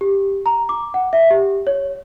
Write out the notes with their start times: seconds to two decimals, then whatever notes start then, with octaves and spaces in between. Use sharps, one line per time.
0.01 G4
0.46 A#5
0.69 D6
0.94 F#5
1.13 E5
1.31 G4
1.67 C#5